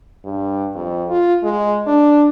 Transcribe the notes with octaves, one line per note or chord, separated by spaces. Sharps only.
G2
F2
F4
G#3
D4